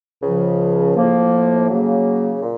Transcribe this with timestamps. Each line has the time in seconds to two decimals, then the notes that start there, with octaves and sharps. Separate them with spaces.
0.22 C#2 C#3 F3
0.96 A2 F3 A#3
1.69 C#3 F#3 A#3
2.42 A#2